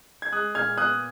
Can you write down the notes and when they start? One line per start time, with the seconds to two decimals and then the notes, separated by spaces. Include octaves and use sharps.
0.22 G#6
0.32 G#3 D#6 F#6
0.55 A#2 F6 G#6
0.77 B3 D#6 F#6